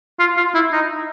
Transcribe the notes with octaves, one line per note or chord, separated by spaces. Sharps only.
F4
F4
E4
D#4